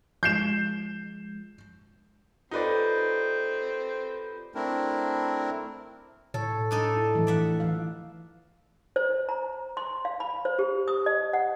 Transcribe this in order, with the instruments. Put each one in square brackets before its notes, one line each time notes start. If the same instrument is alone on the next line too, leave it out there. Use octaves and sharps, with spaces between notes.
[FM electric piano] F3 G#3 [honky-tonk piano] G6 C7 E7
[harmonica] C4 C5 [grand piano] D#4 B4 D5 [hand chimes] F4 G4 A4
[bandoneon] A3 C4 D4 E4 A#4
[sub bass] A2 [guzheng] A4 [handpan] C#5
[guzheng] D4 D#4 A4
[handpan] E4
E3 F3 A3
[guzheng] D5 E5 F#5
[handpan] E3 F5
[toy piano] C5
A#5
C6
F5
B5
C5
G4
D#6
D#5
F#5